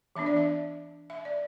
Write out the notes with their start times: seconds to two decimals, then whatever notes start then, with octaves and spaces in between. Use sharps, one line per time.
0.16 E3 B3 D4 E5
0.26 D5
0.36 E5
1.10 E5
1.25 D5